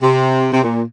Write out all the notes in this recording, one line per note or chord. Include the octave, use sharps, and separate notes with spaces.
C3
C3
A#2